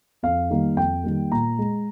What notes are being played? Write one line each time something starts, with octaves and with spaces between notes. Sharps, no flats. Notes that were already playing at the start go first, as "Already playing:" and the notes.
F2 F5
D#3 G3 A#3
F2 G5
D#3 G3 A#3
A#2 A#5
G#3